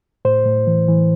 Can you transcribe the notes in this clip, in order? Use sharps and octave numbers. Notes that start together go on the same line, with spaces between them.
A2 C5
A2
E3
E3